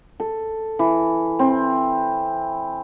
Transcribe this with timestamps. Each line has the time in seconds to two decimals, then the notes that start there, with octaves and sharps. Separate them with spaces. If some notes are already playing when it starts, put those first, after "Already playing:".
0.20 A4
0.79 E3
1.39 C4